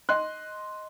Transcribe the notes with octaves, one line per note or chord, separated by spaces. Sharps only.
D#5 C6 F#6